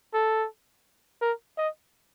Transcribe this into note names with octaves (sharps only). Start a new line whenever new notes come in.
A4
A#4
D#5